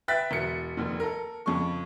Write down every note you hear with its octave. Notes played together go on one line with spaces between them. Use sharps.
B4 E5 G5 F#6 A6 B6
E1 C#7
F1 D#2
A4 A#4
F2 C#3 C#6